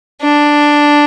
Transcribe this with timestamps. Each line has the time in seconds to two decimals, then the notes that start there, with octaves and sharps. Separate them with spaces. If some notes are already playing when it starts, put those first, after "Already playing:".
0.22 D4